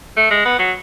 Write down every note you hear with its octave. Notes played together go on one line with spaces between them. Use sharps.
A3
G#3
B3
F#3